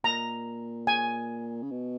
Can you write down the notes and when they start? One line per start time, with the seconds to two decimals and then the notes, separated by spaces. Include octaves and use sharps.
0.04 A#2 A#5
0.87 G#5
1.63 C#3
1.71 B2